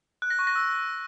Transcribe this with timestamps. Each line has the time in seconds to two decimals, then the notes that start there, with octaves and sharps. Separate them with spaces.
0.22 F#6
0.30 A#6
0.39 C#6
0.47 A#6
0.55 E6